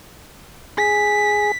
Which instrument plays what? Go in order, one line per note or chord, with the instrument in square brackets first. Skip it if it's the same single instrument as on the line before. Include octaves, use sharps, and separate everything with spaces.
[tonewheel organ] G#4 [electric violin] B6